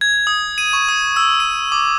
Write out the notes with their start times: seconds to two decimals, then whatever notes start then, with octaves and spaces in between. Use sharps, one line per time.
0.01 G#6
0.27 D#6
0.58 D#7
0.73 C#6
0.88 D#6
1.16 E6
1.40 D#7
1.72 D6